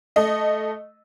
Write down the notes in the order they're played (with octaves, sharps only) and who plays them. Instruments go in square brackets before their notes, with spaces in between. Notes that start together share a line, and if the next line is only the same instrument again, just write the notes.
[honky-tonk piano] A3 D#5